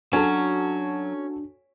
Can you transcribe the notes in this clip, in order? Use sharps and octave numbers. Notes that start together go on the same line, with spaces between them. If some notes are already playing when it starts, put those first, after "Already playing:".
F#3 C#4 D4 F#4 A4